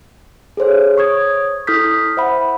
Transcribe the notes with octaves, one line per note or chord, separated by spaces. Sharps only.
G#4 A4 C5 C#5
C#5 C#6 D#6 G#6
E4 A4 D#6 F6 G6 B6
C5 E5 F#5 B5